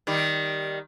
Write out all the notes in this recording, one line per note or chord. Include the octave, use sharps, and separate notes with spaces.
D#3 G3